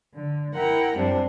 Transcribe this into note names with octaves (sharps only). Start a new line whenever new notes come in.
D3
E4 A#4 F#5 G5
F#2 C3 G3 D4